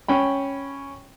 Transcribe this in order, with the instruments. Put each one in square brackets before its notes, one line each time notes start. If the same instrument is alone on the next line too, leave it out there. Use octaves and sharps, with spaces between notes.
[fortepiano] C#4 G5 B5